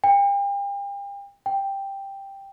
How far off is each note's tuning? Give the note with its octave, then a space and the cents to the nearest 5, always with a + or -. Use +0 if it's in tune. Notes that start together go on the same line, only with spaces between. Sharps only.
G5 +40
G5 +5